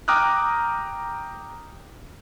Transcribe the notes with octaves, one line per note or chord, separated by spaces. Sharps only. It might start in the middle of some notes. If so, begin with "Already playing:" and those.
G5 A#5 D6 D#6 F6 F#6